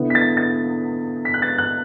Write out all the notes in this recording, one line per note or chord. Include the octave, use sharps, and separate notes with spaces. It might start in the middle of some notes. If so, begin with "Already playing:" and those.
Already playing: D3 B3 E4
B6
A6
A6
B6
F#6
A6
F#6